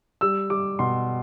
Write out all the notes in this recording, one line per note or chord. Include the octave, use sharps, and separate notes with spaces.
G3 E6
G3 D6
B2 C6